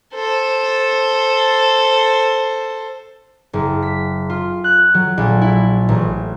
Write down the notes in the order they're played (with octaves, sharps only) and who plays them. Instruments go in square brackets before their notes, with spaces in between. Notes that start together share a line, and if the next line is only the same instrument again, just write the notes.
[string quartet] A4 C5
[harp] F#1
B6
F4
F#6
F#3
A#1
E4
A1